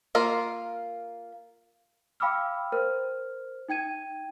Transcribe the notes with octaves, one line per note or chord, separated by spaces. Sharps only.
A#3 F4 A#4
F5 G5 B5 D6 E6 F6
A#4 C5 F6
D#4 G5 G#6 D#7